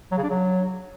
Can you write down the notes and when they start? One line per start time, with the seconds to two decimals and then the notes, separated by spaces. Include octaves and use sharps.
0.12 F#3
0.18 C#3
0.24 D4
0.29 F#3